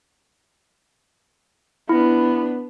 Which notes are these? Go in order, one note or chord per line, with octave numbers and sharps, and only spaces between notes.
B3 D4 E4